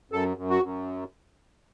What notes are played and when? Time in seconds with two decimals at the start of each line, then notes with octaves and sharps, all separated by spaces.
0.11 F#2 A4
0.37 F#2
0.50 F#4
0.63 F#2